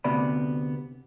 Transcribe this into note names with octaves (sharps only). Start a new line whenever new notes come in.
D2 C3 B3 D5 B5